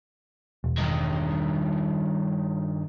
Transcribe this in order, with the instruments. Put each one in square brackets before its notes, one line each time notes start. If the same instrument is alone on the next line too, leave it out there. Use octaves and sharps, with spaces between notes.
[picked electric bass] E1
[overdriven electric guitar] G2 D#3